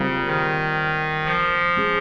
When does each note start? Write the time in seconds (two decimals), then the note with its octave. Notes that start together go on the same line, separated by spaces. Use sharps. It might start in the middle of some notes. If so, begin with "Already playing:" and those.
Already playing: C#3 G3 C4 F4 A#4
0.26 D#3
1.25 F3
1.77 G#3 C#4 G#4